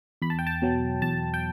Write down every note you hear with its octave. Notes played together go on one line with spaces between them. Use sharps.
E2 B5
A5
G5
A5
B2 F#3
E2 A5
G5